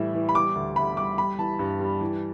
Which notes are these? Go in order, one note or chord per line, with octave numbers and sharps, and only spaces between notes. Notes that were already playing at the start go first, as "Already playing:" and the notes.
Already playing: A2 E3 G3 E5
E3
B5
G3 D6
D2
D2 B5
G3 D6
G3 B5
E3 A5
G2
G3
E3